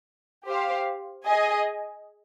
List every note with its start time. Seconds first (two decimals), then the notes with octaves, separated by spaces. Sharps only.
0.46 G4 C5 F5
1.25 G#4 D#5 G#5